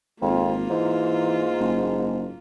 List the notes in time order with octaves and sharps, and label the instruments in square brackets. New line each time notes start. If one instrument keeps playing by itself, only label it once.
[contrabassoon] G#1 [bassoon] F2 [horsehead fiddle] A#3 F4
[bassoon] G#2 [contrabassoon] E3
[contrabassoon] F#1